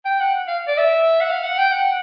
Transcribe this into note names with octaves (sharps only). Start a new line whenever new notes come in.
G5
F#5
F5
D5
E5
F#5
F5
F#5
G5
F#5